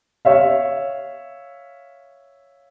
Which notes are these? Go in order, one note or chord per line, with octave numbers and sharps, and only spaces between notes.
C#5 E5 F5